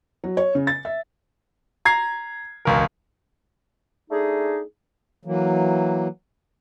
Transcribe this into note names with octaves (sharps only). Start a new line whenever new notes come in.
F#3
C#5
C#3
A6
E5
A#5 G#6 C7
E1 C#2 A#4
A3 D4 D#4 G#4
E3 F#3 A#3